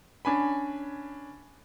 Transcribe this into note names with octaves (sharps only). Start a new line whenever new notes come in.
C#4 D4 G#5 B5